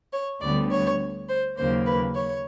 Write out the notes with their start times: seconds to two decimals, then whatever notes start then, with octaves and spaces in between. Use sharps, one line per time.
0.13 C#5
0.41 D2 D3 G3 B3 D5
0.71 C#5
1.29 C5
1.57 D#2 C#3 F#3 A#3 C5
1.86 B4
2.15 C#5